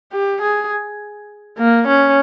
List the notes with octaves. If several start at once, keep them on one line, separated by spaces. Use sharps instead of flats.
G4
G#4
A#3
C#4